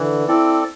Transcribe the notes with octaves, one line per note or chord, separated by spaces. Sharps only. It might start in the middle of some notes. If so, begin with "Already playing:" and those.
Already playing: D3 E3
C4 E4 A4 D5